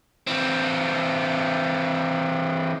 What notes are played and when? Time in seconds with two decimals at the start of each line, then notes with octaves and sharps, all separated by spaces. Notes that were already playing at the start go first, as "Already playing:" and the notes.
0.27 E3 C4